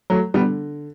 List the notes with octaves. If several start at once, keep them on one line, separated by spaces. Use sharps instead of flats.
F#3 A3
D3 G3 B3